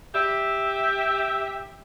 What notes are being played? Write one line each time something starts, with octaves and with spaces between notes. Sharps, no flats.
G4 E5